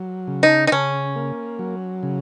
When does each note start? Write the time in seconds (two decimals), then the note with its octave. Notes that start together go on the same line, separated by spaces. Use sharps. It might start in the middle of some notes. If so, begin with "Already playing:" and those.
Already playing: F#3
0.28 C#3
0.43 D#4
0.67 D#4
0.72 C#3 C#4
1.16 A#3
1.59 F#3
2.03 C#3